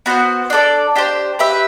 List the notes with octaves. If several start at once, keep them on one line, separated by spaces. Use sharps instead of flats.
B3 F#4 C5
D4 A4 D5
D4 G4 C5
G4 B4 E5